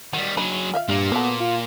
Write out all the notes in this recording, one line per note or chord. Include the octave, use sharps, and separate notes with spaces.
D#3 F#3 G3
F#3 D4 D#4 G#4 B5
F4 E5 F5
G2 A#2 A#3
F#3 B3 A4
F4